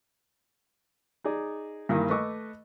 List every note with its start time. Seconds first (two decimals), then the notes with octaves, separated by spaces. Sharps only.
1.24 D#4 G#4 D5
1.89 G2 D#3 E3 A#3 E4
2.09 A3 B4 D#5 C#6 D6 E6